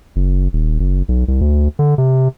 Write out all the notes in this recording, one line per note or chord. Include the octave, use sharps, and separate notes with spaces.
F#1
D#1
F#1
B1
C2
D2
D3
C3